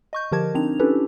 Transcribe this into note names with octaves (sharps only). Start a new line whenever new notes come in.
D#5 C#6 G6
D3 F3 G4 A#4 A5 G#6
C4 D4 D#4 F7
C#4 D4 E4 G4 A4 B4